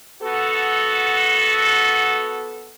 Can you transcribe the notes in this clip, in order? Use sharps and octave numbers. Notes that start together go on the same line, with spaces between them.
B3 F#4 A4